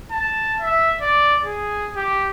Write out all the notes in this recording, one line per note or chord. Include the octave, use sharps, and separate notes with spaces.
A5
E5
D5
G#4
G4